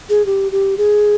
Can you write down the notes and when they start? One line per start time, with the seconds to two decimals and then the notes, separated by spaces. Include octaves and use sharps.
0.09 G#4
0.26 G4
0.52 G4
0.78 G#4